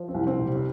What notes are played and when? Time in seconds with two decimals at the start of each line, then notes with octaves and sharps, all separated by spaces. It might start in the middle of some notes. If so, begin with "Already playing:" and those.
Already playing: F3
0.08 C4
0.14 C2
0.27 C4
0.39 C3
0.45 G3
0.55 C4